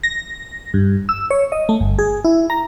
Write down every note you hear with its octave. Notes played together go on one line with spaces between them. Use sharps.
A#6
G2
E6
C#5
D#5
A3
G1
G#4
E4
A#5